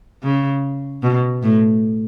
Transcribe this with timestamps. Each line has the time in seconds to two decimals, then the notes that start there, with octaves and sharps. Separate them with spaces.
0.23 C#3
1.03 B2
1.43 A2